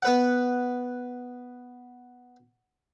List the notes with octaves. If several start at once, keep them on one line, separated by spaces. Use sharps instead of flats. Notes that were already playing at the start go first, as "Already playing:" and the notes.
B3 B4 F#5